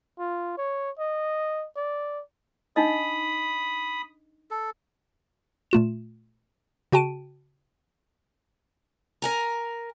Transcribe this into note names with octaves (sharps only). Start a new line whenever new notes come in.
F4
C#5
D#5
D5
D4 D#4 D#5 B5 D#6
A4
A#2 A3 F4 E7
C#3 F#4 G5 A5 D7 D#7
A#4 G#5 A#5